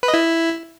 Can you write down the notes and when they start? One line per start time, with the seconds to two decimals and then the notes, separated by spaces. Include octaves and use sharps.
0.03 B4
0.08 D#5
0.14 E4